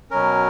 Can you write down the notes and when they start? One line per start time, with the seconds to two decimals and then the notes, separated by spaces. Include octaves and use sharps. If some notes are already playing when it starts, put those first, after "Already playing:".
0.10 B2 F#3 C#4 A#4